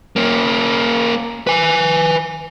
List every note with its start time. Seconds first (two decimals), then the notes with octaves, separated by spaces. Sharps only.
0.16 A#3 C#4
1.47 B4 G#5